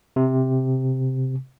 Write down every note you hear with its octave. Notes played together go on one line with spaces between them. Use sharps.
C3